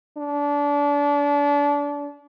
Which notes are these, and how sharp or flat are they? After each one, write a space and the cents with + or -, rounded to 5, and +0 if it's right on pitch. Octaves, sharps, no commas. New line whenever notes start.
D4 -30